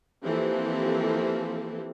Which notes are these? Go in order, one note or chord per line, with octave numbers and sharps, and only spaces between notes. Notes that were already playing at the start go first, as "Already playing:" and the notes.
E3 F3 A#3 C4 G4 A4